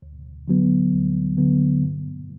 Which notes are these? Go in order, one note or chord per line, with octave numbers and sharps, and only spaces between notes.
D2
D3 F#3 B3
D2
D3 F#3 B3
G2